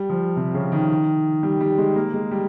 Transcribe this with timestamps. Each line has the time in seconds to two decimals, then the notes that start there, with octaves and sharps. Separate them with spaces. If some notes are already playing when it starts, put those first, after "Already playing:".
Already playing: G3
0.10 F3
0.36 C3
0.54 C#3
0.72 D#3
1.43 G3
1.61 G3
1.78 G#3
1.96 A#3
2.14 G#3
2.31 G3